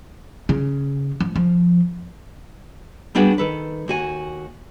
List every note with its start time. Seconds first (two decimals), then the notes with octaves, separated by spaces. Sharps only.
0.49 C#3
1.20 F3
1.36 F3
3.15 G3 B3 D4 F#4 G#4 G5
3.38 D#3 A4 B4
3.88 D#2 F#4 G#5